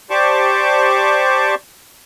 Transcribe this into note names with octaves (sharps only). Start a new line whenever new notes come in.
G4 C5 D5 A5 C#6 D6